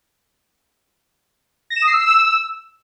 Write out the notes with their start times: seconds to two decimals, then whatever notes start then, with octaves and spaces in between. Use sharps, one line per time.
1.70 A#6
1.76 E7
1.82 D#6
1.87 C7
1.93 E6